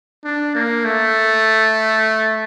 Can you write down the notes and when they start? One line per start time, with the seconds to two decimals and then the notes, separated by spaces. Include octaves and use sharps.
0.25 D4
0.55 A#3
0.85 A3